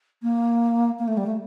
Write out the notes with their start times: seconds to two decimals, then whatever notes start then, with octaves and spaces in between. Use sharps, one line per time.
0.22 A#3
0.99 A#3
1.08 A3
1.17 G3
1.26 A3